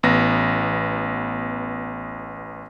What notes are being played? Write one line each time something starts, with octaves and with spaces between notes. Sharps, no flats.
A1 B3 A#6